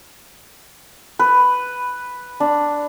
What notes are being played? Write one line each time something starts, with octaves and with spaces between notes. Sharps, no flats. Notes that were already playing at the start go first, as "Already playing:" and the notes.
B4
D4